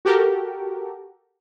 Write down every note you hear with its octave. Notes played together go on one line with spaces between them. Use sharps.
F#4 G4 A4 A#4